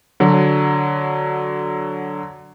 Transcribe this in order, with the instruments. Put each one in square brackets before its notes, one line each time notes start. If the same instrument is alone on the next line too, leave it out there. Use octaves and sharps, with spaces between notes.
[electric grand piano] D3 F#3